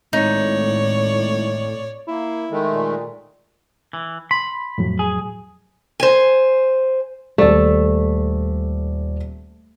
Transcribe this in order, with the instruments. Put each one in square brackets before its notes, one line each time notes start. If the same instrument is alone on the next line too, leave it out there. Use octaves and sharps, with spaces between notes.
[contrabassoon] G#1 [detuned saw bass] A2 [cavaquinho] D#4 [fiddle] C#5 D5
[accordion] A#3 [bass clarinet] E4
[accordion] D#3 G#3 A3
[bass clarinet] A#2
[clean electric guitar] E3
[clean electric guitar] B5 [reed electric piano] C6
[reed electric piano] F2 A2 F#3
[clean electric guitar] G#4
[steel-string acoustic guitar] C5 G#5
[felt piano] D#1 D5 [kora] A3 A4